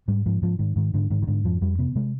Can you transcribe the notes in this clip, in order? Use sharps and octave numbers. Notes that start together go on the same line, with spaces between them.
G#2 G3
G#2 F3
G#2 F3
G#2 D#3
G#2 D#3
G#2 D3
G#2 D#3
D#3
G#2 D3
F2 F3
F2 G3
C3 B3
C3 G#3